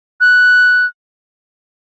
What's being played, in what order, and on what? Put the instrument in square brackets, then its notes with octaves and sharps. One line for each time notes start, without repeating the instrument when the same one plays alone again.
[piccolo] F#6